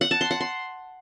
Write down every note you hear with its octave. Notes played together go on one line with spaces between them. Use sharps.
F#5
A5
C6
F#5
C6